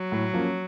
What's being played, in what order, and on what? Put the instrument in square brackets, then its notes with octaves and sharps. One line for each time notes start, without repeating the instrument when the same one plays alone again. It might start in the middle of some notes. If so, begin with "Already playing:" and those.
Already playing: [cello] F#3
[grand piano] A2
F3 A#3 C#4